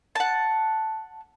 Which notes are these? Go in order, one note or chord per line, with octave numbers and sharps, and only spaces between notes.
F#5 A5